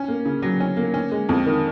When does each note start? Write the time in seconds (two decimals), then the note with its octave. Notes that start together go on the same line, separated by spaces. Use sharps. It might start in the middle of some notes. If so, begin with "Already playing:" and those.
Already playing: C#4
0.08 A#3
0.25 C#3
0.42 F#3
0.60 C#4
0.77 A#3
0.94 C#4
1.12 G#3
1.29 F2
1.46 D#3